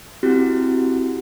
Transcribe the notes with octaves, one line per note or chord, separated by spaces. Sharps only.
C4 E4 F#4 G4